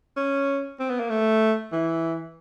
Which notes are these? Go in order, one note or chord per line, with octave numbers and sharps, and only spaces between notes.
C#4
C4
B3
A#3
A3
E3